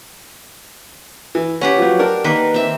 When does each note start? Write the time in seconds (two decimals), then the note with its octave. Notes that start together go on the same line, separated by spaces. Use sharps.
1.35 E3
1.61 C#4 G4 B4 F#5
1.78 F3 F#3
1.99 D4 A#4
2.24 D#3 A#3 B4
2.54 C4 E5